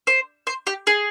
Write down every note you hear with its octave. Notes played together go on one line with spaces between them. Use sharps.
C5
C5
G4
G#4